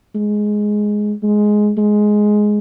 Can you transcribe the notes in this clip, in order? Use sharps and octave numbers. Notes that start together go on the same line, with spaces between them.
G#3
G#3
G#3